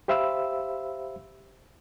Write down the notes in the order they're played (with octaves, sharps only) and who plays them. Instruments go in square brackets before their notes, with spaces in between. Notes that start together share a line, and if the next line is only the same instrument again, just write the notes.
[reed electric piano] G4 C5 E5 F5 B5 E6